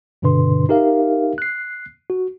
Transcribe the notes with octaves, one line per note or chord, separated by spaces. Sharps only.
G2 B2 D3 D4 B4 C6
D#4 G4 A#4 E5 F5
F#6 C7
F#4